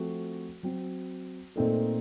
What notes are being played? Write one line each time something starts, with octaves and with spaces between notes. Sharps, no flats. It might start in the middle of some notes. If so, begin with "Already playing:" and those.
Already playing: F3 A3 C4 F#4
F#3 C4 F#4
A#2 A3 C4 D#4 A4